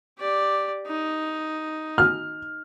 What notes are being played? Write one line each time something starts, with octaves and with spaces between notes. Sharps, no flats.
G4 D5
D#4
F6